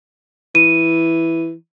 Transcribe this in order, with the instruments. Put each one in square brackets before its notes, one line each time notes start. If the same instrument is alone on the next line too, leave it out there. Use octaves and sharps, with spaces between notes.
[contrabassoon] E3 [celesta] D#7